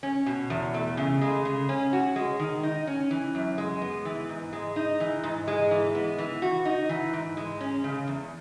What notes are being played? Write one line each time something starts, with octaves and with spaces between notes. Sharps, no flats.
C#4
B2
E2
A3
C#3
G#3
C#3
C#4
F#4
G#3
D#3
D#4
C#4
E3
F#2
G#3
B3
E3
G#2
G#3
D#4
E3
G#2
G#3
E3
B3
E3
F#4
D#4
E3
G#2
G#3
C#4
C#3
E2